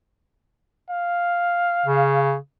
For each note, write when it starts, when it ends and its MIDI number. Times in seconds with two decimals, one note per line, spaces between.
0.90 2.23 77
1.86 2.36 49